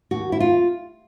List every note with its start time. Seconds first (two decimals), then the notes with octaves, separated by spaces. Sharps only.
0.11 D#2 F#4
0.32 E4
0.40 F4